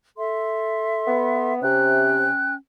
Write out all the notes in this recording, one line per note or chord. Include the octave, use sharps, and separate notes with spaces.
A4 E5 C6
B3
C3 C#4 G5 F#6